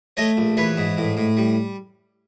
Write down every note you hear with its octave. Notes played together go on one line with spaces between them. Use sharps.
A3 C#5 D#5
A#1
E3 B4 C#5
G#2
A2
A2
G3